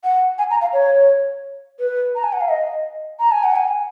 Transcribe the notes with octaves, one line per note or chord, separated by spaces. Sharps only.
F#5
G#5
A#5
F5
C#5
B4
A#5
G#5
F#5
F5
D#5
A#5
G#5
F#5
G#5